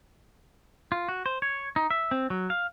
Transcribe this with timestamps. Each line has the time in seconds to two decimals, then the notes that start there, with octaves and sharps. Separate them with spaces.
0.92 F4
1.09 F#4
1.26 C5
1.42 C#5
1.76 D#4
1.91 E5
2.11 C4
2.30 F#3
2.50 F5